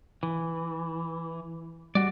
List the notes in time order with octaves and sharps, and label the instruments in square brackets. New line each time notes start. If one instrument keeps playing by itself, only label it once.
[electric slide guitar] E3
[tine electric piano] G3 [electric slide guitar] F#4 D5